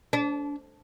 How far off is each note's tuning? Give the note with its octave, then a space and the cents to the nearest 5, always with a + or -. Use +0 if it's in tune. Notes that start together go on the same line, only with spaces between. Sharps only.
D4 -30